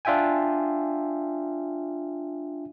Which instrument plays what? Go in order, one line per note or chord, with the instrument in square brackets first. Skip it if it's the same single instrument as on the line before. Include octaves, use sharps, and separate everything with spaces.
[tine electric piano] D4 F4 E5 G5 G#5